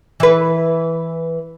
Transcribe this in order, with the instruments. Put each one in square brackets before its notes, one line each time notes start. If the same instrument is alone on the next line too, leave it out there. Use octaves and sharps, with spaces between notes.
[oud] E3 B4